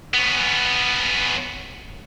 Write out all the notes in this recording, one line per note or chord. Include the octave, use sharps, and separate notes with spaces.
B3 C#4